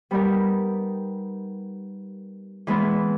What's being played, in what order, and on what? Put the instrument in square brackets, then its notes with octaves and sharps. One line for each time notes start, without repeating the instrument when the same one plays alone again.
[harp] G3 B3 D#4 G4 A#4
E3 G#3 B3